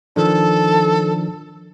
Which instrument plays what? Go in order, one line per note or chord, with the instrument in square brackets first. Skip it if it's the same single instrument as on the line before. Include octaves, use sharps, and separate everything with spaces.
[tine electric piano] D#3 F3 D4 [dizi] A4